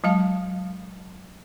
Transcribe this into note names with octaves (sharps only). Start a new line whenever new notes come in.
F#3 G#3 F5 A5